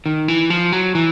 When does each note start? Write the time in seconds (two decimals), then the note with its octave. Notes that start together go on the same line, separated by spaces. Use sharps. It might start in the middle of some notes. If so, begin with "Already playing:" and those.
0.06 D#3
0.28 E3
0.50 F3
0.72 F#3
0.95 E3